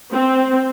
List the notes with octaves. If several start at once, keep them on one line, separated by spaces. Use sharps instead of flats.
C4